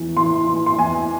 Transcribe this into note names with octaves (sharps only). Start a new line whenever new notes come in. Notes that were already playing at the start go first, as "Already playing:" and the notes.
Already playing: E2 E3
E3 C6
E3 C6
C6
E2 G#5